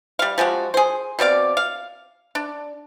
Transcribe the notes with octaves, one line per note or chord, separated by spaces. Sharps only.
G3 F5
F3 G#3 F#4 G4
G#4 C5
B2 C4 D5 F5
F5
D4